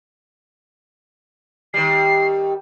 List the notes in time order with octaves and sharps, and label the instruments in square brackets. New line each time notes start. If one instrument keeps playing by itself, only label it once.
[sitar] D#3 G3 [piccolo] C7